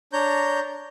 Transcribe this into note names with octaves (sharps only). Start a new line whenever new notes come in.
D4 C#5 A#5 G6